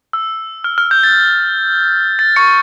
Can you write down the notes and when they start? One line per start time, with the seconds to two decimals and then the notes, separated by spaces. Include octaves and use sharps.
0.13 E6
0.64 F6
0.78 F6
0.91 G6
1.04 A6
2.19 A6
2.36 C#6 C#7